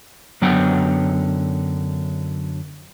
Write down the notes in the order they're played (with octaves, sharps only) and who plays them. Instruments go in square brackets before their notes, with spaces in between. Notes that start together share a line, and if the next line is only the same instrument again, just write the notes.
[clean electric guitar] F#2 D3 F#3 B3 F#5 G5